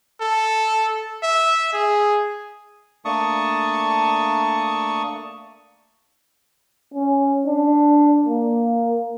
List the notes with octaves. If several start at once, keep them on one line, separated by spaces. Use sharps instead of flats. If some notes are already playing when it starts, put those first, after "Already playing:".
A4
E5
G#4
A3 A#3 D4 A5 C#6 D#6
C#4
D4
A#3